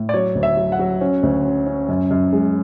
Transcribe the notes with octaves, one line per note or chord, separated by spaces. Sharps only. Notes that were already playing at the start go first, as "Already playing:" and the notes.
Already playing: A2
D5
F#3 C#5
D2
E5
F#3
F#5
F#3
C#4
D2
C#4
C#4
F#2
F#2
G#3